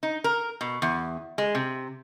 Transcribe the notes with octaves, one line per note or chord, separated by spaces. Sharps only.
D#4
A#4
B2
E2
G#3
C3